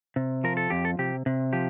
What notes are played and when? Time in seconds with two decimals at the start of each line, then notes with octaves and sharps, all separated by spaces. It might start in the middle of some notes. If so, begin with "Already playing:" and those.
0.16 C3
0.44 F3 A#4
0.57 A4
0.70 F2 G4
0.85 A4
0.99 C3 G4
1.26 C3
1.53 F3 G4